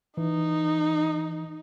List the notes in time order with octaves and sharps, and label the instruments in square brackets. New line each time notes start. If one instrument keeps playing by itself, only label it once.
[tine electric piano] E3 [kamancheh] D#4